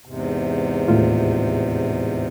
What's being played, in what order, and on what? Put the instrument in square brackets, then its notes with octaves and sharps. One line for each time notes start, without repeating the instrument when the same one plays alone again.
[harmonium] E2 G#2 C3
[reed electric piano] D#2 A2 F4